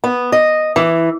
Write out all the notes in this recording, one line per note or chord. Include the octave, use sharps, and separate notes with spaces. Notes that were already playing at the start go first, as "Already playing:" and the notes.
B3
D#5
E3